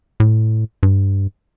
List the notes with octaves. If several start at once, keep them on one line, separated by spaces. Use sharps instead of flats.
A2
G2